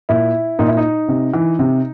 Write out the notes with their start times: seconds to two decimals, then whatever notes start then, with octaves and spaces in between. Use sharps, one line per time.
0.09 A#2 E4
0.59 A#2 D#4
0.68 E4
0.77 D#4
1.08 C3
1.34 E3
1.59 C3